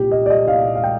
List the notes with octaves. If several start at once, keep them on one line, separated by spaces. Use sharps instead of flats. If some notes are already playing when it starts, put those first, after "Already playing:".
Already playing: C2 A#2 G4
D#5
D5
D#5
C2 A#2 F5
F5
G5